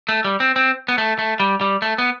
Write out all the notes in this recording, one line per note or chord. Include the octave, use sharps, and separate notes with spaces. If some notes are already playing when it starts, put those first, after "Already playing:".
A3
G3
C4
C4
B3
A3
A3
G3
G3
A3
B3